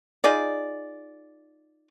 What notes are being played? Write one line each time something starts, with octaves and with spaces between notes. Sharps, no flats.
D#4 F4 G#4 D5